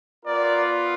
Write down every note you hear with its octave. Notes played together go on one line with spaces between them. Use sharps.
B3 F4 A#4 D5